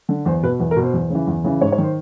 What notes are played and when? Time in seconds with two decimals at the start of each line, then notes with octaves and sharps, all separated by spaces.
0.09 D3
0.26 E2 C5
0.43 B2 B4
0.60 E2 B4
0.71 A#4
0.76 B2
0.83 C5
0.93 E2
1.10 C#3 E3
1.27 E2
1.44 C#3 E3
1.61 G#2 C#5
1.72 C#5
1.78 D#3 C5